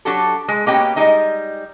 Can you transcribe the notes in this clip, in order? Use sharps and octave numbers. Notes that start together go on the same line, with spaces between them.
F#3 D4 F#4 G4 A4
G#3
B2 A#3 C#4 G4 D#5 G5
G3 G#3 D#4 D#5